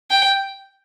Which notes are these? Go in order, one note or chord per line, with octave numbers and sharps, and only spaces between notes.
G5